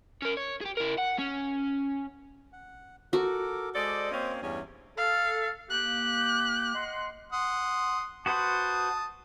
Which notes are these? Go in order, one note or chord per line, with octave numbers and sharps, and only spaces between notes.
C#4 A#4
C#5
G4 G#4
E4 A#4
F#5
C#4
F#5
F#4 A4 A#4 D6
G#3 A4 C5 D5 D#5 D#6
A#3 C4 C#4
E2 G2 C#4
A4 F5
A#3 G4 F#6
D#5 F#5 C6
F#5 C6 D#6
F#4 B4 C5 A5 D#6